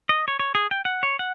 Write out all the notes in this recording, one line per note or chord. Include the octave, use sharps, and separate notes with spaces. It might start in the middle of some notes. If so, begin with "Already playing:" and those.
D#5
C#5
C#5
G#4
G5
F#5
C#5
F#5